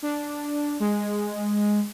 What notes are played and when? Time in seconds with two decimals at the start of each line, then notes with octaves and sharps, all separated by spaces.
0.02 D4
0.80 G#3